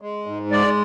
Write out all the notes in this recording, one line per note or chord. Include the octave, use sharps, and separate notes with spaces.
G#3
G#2
G#3 D5